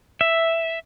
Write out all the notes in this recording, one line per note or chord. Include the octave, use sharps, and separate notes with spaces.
E5